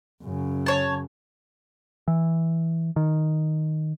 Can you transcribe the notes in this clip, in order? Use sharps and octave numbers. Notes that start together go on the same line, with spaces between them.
F#2 C#3
C#5 A5
E3
D#3